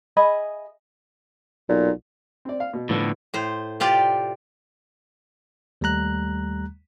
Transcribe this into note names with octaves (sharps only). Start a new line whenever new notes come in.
G#4 D#5 E5 B5
B1 A#2
C4 D5
F5
B2
A2 D3 F3 A3 B3
A2 C5
C3 F4 G4 D5
D#2 G3 A3 A#5 F#6